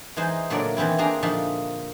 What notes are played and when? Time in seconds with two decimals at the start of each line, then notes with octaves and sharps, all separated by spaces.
0.17 E3 G#3 D#4 C5
0.50 A#2 D3 F#3 A3 A#4 D5
0.77 D#3 E3 B3 C4 E4
0.98 A#3 C4 D4 G#4 G#5 A#5
1.22 A#2 D3 F3 D#4 E5